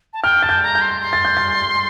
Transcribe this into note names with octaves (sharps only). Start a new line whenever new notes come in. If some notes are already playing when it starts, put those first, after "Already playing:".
A5
G5 F6
A5 A6
G6
A#5
G6
C6
C6
A6
G6
A6